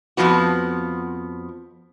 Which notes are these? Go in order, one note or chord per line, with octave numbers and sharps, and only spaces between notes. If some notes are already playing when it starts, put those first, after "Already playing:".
F2 G#2 F3 B3 F#4